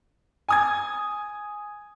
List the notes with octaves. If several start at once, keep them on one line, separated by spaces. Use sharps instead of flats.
G#5 D#6 G#6